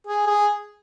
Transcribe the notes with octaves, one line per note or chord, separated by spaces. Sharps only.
G#4
G#4